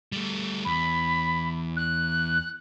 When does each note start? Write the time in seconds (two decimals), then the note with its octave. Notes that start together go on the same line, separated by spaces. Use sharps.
0.12 G3 A3
0.65 E2 B5
1.77 F#6